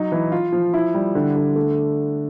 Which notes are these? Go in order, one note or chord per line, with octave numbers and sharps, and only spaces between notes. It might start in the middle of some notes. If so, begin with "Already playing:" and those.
Already playing: F#3 D#4
E3
F4
F3
E4
G3
D3
D3
A3